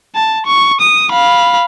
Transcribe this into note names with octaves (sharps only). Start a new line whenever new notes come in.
A5
C#6
D#6
F5 B5